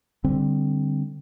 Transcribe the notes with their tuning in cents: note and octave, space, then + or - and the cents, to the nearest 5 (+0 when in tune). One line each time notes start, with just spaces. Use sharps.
D3 +0 G3 +0 C4 +0